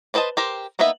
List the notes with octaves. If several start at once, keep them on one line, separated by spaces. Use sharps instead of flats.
D4 B4 C5 D#5 A5
G4 A#4 C5
A#3 B3 D#4 B4 E5